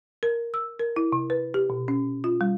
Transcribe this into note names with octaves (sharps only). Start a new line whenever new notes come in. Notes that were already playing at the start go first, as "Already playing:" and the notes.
A#4
E6
A#4
E4
C3
B4
G4
B2
C#4
F4
G3